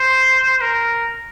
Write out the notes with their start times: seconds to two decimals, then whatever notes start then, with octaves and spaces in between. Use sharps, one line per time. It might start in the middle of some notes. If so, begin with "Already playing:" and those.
Already playing: C5
0.61 A#4